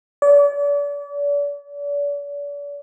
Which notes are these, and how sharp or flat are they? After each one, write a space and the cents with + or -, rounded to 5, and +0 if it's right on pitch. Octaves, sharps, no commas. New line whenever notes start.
D5 -40